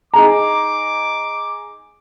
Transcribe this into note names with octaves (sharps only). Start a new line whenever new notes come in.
D#4 G#4 A#5 D6